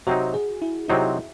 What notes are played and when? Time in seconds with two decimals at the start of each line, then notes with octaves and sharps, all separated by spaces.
0.07 C3 F#3 C4 D#4 F#4
0.34 G#4
0.62 E4
0.88 C3 F#3 C4 D#4 E4